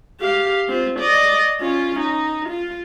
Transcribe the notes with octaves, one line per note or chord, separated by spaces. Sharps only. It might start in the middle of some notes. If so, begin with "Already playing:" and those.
G4 F5
C4 F4
D5 D#5
C#4 F4
D#4
F4